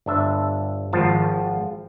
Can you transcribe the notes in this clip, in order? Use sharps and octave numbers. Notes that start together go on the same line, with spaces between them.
G1 D4 E5
G#1 F3 F4 A5